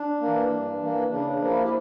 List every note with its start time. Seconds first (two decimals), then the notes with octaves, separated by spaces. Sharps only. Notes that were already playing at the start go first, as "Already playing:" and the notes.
Already playing: D4
0.20 E3 A#3
0.50 G2
0.80 E3 A#3
1.10 C#3 D4
1.29 D4
1.40 F3 A#3
1.50 E4
1.64 G4